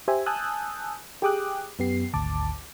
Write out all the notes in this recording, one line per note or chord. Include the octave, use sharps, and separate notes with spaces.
G4 C5 E5 G#5
G#5 A5 D#6 E6 F#6 G6
G4 G#4 G5 D6 D#6 F#6
F#2 B3 G4 C7
G#1 D2 A5 D6